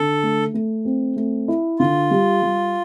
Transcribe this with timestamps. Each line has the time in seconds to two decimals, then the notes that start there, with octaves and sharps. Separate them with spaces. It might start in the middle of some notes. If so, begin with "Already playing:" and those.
Already playing: D3 A4
0.23 A3
0.54 A3
0.85 C4
1.16 A3
1.48 E4
1.79 D3 F4
2.11 G3
2.42 G3